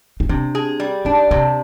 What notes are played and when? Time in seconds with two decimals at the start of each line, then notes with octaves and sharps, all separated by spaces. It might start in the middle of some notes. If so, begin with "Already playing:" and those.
0.20 D#4
0.29 C3 D4
0.55 G#4
0.80 G3
1.05 D4 D#4
1.31 C3 C4